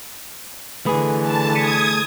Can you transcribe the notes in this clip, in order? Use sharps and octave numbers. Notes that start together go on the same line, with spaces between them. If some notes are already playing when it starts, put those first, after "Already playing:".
D3 E3 A3 G#4 B4 B5 D#6
A5
D#6 G#6 B6 C#7 D#7